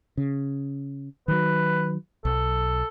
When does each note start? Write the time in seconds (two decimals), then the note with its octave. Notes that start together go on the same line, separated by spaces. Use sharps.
0.17 C#3
1.28 D#3 F#3 B4
2.25 B1 A4